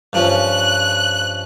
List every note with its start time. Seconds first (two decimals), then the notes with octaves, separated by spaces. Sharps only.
0.13 G2 F3 C#4 F#6